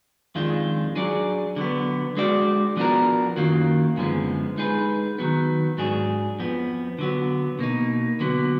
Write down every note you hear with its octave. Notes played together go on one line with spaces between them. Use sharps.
F2 D#3 G#3 D4 F4
F#3 D4 G#4 D5
D3 F#3 B3
G#3 D4 F#4 D5
F3 B3 D4 F#4 A#4
F#2 D#3 F#3 A#3 F4
F#2 D3 F3 G#3 B3
G#3 D#4 G#4 B4
D#3 F#3 B3
G#2 F#3 D4 G#4
F2 F3 B3
D3 F#3 B3
B2 A#3 D#4
D3 F#3 B3